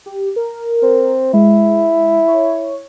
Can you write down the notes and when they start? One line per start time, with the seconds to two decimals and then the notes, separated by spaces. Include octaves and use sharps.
0.06 G4
0.36 A#4
0.83 C4
1.34 G#3 E4
2.28 C#5